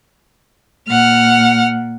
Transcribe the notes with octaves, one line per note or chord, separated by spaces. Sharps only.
A#2 F#5 F6